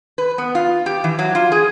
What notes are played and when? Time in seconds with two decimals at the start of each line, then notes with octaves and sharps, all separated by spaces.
0.18 B4
0.38 B3
0.55 F4
0.86 G4
1.04 E3
1.19 F#3
1.35 F4
1.52 G#4